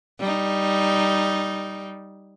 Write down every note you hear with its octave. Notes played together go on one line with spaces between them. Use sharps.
G3 D#4